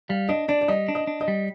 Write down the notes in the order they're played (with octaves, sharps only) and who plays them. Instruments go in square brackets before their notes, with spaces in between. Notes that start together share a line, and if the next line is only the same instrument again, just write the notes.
[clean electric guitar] G3 [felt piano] F5
[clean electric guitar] D4 [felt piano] D#5
[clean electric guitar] D4 [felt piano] D5
[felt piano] D5
[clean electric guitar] G3 [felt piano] D#5
[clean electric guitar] D4
[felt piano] D#5
[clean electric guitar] D4
[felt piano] D#5
[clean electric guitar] G3